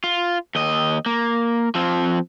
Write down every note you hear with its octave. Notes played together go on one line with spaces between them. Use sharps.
F4
D#2 D#5
A#3
F3 C4